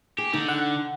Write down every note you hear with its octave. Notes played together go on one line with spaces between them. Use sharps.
G4 G#4
D3 D#4
F#5